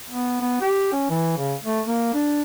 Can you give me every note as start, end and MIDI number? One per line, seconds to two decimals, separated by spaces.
0.10 0.41 59
0.41 0.61 59
0.61 0.88 67
0.92 1.07 61
1.10 1.35 52
1.37 1.54 49
1.64 1.80 57
1.86 2.09 58
2.14 2.43 62